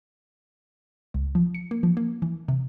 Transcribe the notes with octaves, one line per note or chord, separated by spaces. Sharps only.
C#2
F3
C#7
A#3
F3
A#3
E3
C3